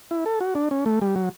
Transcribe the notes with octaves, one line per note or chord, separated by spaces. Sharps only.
E4
A4
F#4
D4
C#4
A3
G3
F#3